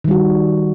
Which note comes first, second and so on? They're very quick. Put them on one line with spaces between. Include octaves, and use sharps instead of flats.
D#3 G3 F#4